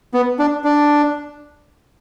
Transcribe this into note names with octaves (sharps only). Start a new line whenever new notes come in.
B3
D4
D4